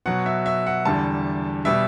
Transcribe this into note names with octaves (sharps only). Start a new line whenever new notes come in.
B2 F#3 F#5
E5
E5
F#5
E2 D3 G3 A5
B2 G3 E5